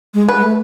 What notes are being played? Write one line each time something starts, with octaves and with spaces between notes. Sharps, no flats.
G#3
B4
G#3
A3